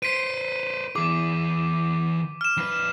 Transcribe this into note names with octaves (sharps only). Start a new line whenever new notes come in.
B4 C5 B6 D7 D#7
E3 G#4 D6
F6 E7
F2 B4